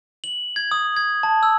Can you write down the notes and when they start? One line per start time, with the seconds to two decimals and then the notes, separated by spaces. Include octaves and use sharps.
0.24 F#7
0.56 G#6
0.71 D#6
0.97 G#6
1.23 A5
1.43 E6